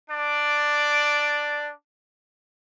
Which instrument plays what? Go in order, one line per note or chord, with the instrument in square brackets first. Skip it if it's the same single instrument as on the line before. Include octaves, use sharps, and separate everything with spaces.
[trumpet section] D4 D5